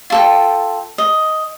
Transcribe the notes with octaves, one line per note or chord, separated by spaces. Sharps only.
F4 A4 G5
D#5